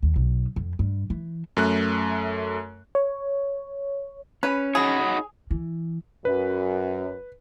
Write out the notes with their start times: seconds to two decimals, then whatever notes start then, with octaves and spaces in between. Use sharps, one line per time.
0.03 D#2
0.16 B1
0.56 F2
0.79 G2
1.10 E3
1.57 F#2 A3 F#6
2.95 C#5
4.43 C#4 B4
4.75 D#4 F#4 G#4 C#5 B5
5.51 E3
6.25 F#2 B4